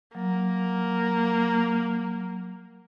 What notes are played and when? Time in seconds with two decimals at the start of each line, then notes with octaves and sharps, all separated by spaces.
0.15 F#3 A#3